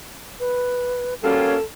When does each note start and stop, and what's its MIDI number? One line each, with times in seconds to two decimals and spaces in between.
0.40 1.14 71
1.23 1.55 55
1.23 1.55 58
1.23 1.54 61
1.23 1.55 65
1.23 1.57 66
1.23 1.63 69